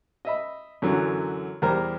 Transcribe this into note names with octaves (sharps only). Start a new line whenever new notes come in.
D#5 E5 B5
F#2 D3 E3 F#3
E2 G3 A#4 C5 A#5